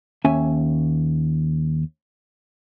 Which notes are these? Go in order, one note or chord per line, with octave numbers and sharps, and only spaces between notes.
D#2 C#4 E5 G#5